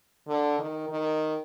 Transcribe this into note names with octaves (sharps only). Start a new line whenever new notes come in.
D3
D#3
D#3